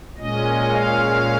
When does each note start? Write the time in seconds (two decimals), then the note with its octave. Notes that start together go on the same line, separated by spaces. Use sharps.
0.17 A#2 G#3 C#4 D#5
0.71 F5